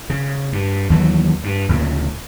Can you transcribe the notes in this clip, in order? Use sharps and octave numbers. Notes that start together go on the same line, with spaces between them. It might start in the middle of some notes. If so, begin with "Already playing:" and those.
C#3
G2
D#2 E3 F#3
G2
D2 A#2 C#3 A#3